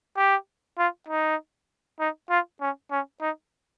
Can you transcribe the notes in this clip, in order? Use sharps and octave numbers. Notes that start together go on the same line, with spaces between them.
G4
F4
D#4
D#4
F4
C#4
C#4
D#4